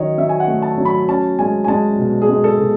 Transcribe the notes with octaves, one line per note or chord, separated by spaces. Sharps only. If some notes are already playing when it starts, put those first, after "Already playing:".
Already playing: D#3 F#3 D#4 C#5 D#5
F#3 E5
G#5
F#5
A3
A5
F#3
B5
C#4 A5
G#3 G#5
G#5
G#3 A5
B2
G#4
G#3
A4
B2